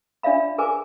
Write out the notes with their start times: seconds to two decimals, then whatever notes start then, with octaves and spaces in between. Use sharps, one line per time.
0.23 D4 D5 E5 F5 B5
0.58 G#4 A#4 B4 G#5 D6